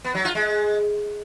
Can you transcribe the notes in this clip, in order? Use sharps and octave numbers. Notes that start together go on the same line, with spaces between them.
B3
F#3
F4
G#3